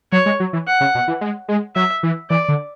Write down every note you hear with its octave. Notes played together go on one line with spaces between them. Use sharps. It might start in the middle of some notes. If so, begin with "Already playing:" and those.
F#3 C#5
G#3
F#3
E3
F#5
C#3
B2
E3
G#3
G#3
F#3 E5
E3
E3 D5
D3